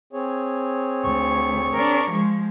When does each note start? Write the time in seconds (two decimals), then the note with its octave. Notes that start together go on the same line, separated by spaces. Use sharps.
0.13 C4 G#4 C#5
1.04 D2 C#6
1.74 D4 A#4
2.10 F3 G#3